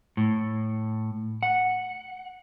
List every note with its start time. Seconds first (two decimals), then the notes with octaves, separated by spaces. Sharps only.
0.17 A2
1.43 F#5